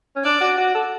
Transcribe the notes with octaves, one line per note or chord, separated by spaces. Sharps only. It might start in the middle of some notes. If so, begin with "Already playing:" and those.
C#4
D4 D5
F#4
F#4
A4